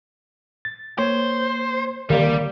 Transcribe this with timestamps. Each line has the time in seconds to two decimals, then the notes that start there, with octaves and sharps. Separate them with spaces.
0.65 A6
0.99 A#3 C5 C#5
2.10 D3 D#3 G3 A#3 G4 A#4 D5 F5